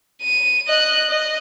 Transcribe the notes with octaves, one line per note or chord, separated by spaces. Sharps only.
D#7
D#5 F#6
D#5